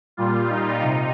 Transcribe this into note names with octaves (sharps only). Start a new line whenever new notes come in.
A#2 G3 F4
D#4
C3